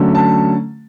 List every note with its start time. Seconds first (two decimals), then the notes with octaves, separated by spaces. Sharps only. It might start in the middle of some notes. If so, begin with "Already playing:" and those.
Already playing: D3 F#3 A3 C#4
0.15 A5